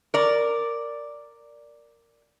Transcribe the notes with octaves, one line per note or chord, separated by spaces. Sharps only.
A#4 D5